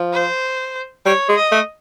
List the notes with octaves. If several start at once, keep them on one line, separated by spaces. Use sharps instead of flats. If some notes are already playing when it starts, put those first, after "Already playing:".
Already playing: F3
C5
G3 C#5
G#3
D#5
A3